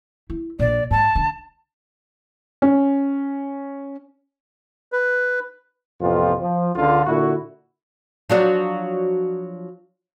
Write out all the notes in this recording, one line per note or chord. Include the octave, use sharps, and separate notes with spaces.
E4
A#1 D5
G#2 A5
D3
C#4
B4
A1 F2 C3 F3 B3 F4
F3
C#2 D3 F4
A#2 D3 E4 F#4
F3 F#3 D4